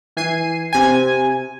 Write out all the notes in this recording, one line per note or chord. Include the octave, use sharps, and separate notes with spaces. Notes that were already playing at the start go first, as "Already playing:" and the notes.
E3 G#5 C7 D#7
C3 G#5